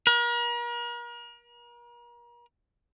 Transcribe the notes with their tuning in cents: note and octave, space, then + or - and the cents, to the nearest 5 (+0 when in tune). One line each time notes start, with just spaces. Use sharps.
A#4 +40